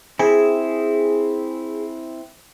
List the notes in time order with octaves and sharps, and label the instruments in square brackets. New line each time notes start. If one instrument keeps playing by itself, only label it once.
[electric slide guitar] C4 E4 [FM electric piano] G#4